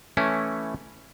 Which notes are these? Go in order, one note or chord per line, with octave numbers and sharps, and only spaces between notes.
E3 A3 C#4 E4